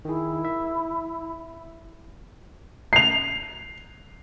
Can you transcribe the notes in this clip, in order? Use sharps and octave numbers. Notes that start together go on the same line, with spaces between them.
D#3 E4 G#4
E5
C7 F7